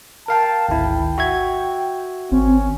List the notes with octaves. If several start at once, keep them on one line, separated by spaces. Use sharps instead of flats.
A#4 F5 G5 A5
G#1 D2 E4 G5
F#4 E5 G#6
G#1 C4 C#4